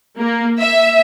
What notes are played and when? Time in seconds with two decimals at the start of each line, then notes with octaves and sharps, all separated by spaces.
0.19 A#3
0.60 E5